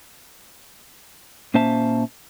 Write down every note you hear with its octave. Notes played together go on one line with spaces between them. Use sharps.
A#2 A#3 C#4 C5 E5 A5